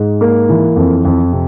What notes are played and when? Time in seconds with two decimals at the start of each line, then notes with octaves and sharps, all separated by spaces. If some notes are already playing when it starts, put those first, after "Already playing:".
Already playing: G#2
0.21 A#3
0.49 E3
0.76 F2
1.05 F2
1.33 C3